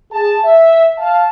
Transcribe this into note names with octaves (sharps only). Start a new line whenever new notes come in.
G#4 A5
E5
F5 A5